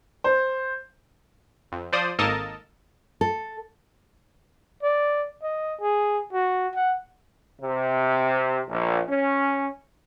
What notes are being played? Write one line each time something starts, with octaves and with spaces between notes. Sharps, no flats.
C5
F2
F3 C5 D5 D#6
G#1 A#3 A4 A#4 D#5 A5
A4
D5
D#5
G#4
F#4
F#5
C3
A#1
C#4